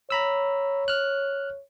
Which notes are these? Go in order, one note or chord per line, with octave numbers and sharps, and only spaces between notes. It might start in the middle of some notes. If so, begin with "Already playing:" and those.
C#5 A#5 B5 E6
F6 F#6